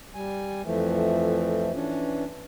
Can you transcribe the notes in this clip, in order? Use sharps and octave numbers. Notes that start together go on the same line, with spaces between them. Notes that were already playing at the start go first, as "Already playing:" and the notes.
G3 G#5
F2 E3 F3 A3
E3 C#4 D4